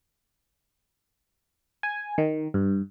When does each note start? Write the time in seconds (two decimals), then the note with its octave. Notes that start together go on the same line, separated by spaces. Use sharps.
1.83 G#5
2.18 D#3
2.54 G2